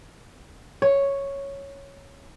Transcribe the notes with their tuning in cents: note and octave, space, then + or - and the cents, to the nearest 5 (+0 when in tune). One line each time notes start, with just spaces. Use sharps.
C#5 +0